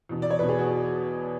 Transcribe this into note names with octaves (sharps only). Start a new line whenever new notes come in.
E2 B2
D5
C#5
E2 B2 B4
G#4
F#4